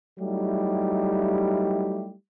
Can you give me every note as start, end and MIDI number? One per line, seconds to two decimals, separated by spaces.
0.19 2.13 54
0.19 2.13 55
0.19 2.13 57
0.19 2.13 63
0.19 2.13 64
0.19 2.13 67